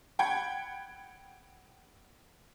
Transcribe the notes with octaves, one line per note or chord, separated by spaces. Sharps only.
F#5 G5 B5 G#6